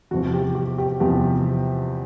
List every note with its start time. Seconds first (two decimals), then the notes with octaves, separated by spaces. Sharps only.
0.11 E2 C3 F3 F#4
0.34 G4
0.55 G4
0.78 G4
1.00 E2 C3 F3 G4